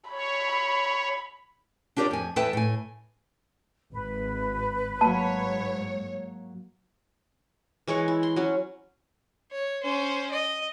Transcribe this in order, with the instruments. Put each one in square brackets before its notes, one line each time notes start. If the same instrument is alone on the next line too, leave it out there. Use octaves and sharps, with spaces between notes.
[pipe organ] C#5 [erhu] B5
[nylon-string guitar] D4 F4 G4 A#4 C#5 D5
F2 G#5
E2 A4 B4 E5 G5 A5
A2 G#5
[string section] G#1 [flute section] B4
[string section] G#2 C#5 [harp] F#3 A#3 [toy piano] A5
[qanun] E3 G#3 C#5 C#6
E4
C6
F#3 C#4
[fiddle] C#5
C#4 C5
D#5